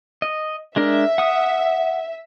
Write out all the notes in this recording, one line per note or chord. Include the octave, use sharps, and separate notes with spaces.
D#5
G#3 D4 A#4 E5
F#5 D#6